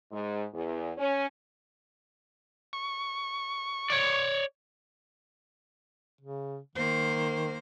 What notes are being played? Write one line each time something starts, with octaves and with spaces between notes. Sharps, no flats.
G#2
E2
C#4
C#6
C#5 D5
C#3
D#3 A#3 C5